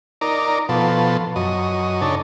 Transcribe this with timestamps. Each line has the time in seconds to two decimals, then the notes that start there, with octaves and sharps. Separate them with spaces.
0.21 D#4 A#4 D5
0.69 B2 F3 A4
1.36 F#2 D#5
2.01 C#3 D4 D#4 A4